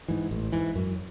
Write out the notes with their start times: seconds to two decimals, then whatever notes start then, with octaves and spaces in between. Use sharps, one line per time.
0.08 G#2 E3
0.31 A1
0.52 G#2 E3
0.76 F#2